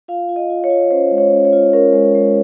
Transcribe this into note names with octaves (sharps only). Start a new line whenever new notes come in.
F4 F5
F4
D#5
F4
C#5
F4
C#4 C5
G#3
C#5
C#4
C#5
F4
C#4 A#4
G#3
G#3